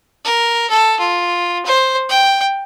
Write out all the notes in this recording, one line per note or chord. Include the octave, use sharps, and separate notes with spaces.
A#4
A4
F4
C5
G5